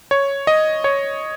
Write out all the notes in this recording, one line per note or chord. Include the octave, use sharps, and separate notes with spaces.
C#5
D#5
C#5